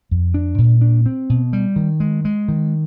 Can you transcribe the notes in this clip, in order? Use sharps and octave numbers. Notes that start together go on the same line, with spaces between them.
F2
D4
A#2
D4
C4
B2
G3
D#3
G#3
G#3
D#3